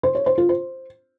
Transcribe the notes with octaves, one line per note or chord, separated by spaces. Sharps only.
C5
C#5
C5
F4
C5